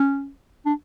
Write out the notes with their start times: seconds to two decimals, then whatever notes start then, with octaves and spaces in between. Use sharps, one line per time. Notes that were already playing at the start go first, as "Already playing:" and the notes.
Already playing: C#4
0.66 D4